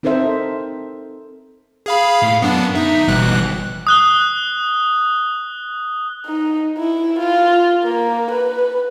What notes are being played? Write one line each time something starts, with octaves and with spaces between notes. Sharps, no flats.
C4 D#4 A4 A#4 C5 E5
G#4 F5 B5
A2 F5
F#2 B3 D4
D2 D#4 E5
G1 B2 E3 G3 F#6
D#6 F#6 G7
D#4
E4
F4
A#3
B4